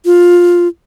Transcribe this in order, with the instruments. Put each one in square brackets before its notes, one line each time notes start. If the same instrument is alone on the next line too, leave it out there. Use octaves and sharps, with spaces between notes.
[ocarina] F4